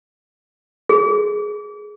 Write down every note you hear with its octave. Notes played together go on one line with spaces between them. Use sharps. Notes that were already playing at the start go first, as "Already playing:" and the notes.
G#4